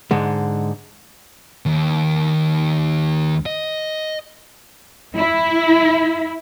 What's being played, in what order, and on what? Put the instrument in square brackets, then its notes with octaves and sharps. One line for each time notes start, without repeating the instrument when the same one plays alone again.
[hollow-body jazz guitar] G#2 D3 G#3
[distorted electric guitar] D#2
D#5
[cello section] E4